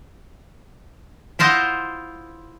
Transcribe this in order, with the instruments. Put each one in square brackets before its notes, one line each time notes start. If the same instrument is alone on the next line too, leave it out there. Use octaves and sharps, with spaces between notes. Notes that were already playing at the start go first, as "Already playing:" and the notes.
[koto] E4 F4 C5 D#5 F#5